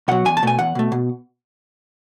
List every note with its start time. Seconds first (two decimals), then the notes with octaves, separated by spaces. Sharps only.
0.08 B2 F#3 F#5
0.25 E2 G#5
0.37 A5
0.43 B2 A3 G#5
0.59 E2 F#5
0.75 B2 A3
0.92 B2